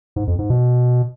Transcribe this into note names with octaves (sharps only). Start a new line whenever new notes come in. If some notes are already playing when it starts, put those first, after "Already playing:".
G#2
F2
G#2
B2